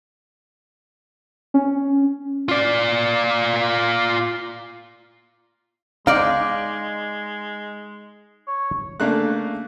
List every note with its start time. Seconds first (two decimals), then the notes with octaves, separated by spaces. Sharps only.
1.54 C#4
2.49 F4 D5
6.07 G#3 D#4 D5 F5
8.47 C#5
9.00 C#3 A3 A#3 D4 F#6